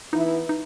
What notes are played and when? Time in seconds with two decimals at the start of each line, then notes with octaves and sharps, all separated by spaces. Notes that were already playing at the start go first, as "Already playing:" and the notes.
0.13 E3 B3 D#4 E4
0.49 D#4